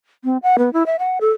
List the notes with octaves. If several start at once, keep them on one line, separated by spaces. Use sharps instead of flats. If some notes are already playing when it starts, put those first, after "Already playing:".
C4
F#5
B3
E4
E5
F#5
A4